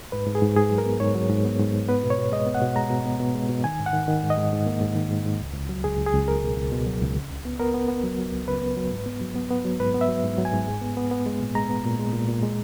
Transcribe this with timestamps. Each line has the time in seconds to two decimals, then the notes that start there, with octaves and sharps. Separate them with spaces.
0.12 G#2 B4
0.27 G#2
0.35 G#4
0.42 G#2
0.57 G#2 G#4
0.71 F#3
0.78 A#4
0.85 B3
1.00 G#2 C#5
1.15 F#3
1.30 G#2
1.45 B3
1.59 G#2
1.74 G#2
1.89 B3 B4
2.03 B2
2.10 C#5
2.18 B2
2.32 G#3 D#5
2.47 B3
2.55 F#5
2.62 B2
2.76 G#3 A#5
2.90 B2
3.06 B3
3.20 B2
3.35 G#3
3.49 B2
3.64 D#3 G#5
3.79 G#2
3.86 F#5
3.93 D#3
4.08 D#3
4.23 G#2
4.30 D#5
4.38 G#2
4.53 G#2
4.66 A#3
4.81 G#2
4.95 D#3
5.11 G#2
5.26 G#2
5.40 C#2
5.54 C#2
5.69 F#3
5.84 C#2 G#4
5.98 C#2
6.06 G#4
6.13 C#2
6.28 C#2 A#4
6.43 B2
6.57 C#2
6.72 B2
6.87 F#3
7.01 C#2
7.16 C#3
7.31 C#2
7.45 B3
7.59 B3 A#4
7.74 B3
7.88 B3
8.04 F#3
8.18 F#3
8.32 C#2
8.48 C#3 B4
8.62 B3
8.77 F#3
8.91 G#2
9.06 B3
9.21 F#3
9.36 B3
9.51 B3
9.65 F#3
9.80 G#2 B4
9.94 B3
10.01 E5
10.09 F#3
10.24 G#2
10.38 F#3
10.45 G#5
10.53 G#2
10.68 G#3
10.82 B3
10.97 B3
11.11 B3
11.26 G#3
11.41 A#2
11.55 G#3 A#5
11.70 B3
11.85 A#2
11.99 G#3
12.13 A#2
12.28 A#2
12.43 G#3